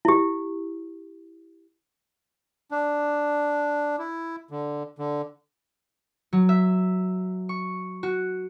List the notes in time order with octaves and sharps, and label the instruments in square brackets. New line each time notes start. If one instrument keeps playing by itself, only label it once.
[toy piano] E4 G4
[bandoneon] D4
E4
D3
D3
[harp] F#3
E5
C#6
F#4